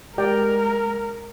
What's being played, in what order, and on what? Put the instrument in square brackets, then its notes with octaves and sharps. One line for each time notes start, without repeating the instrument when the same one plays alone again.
[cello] G#3 [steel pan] G4 D5 G5 [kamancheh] A#4